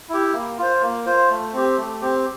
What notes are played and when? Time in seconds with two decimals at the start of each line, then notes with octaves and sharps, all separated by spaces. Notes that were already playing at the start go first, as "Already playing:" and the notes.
0.09 E4 G4
0.34 A#3
0.58 F4 C5
0.82 A#3
1.06 F4 C5
1.29 A3
1.53 C4 G4
1.77 A3
2.02 C4 G4